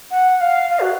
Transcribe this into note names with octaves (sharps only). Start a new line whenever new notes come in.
F#5
F5
F5
F#4